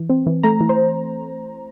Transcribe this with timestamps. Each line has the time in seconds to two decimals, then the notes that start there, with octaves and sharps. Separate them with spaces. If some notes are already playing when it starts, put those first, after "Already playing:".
Already playing: E3
0.10 C4
0.26 E3
0.43 A3 A#5
0.61 E3
0.69 C5